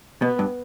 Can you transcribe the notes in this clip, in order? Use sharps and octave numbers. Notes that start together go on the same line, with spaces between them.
B2 B3
G2